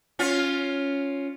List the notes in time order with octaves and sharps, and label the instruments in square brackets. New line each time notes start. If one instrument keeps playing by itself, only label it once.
[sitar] C#4 F4